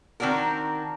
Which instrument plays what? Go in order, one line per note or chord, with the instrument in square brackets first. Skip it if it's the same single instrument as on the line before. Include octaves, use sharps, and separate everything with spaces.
[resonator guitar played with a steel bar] D#3 C4 D4 F#4 A#4